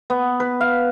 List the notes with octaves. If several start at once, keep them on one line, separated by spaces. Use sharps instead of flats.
B3
B4
F5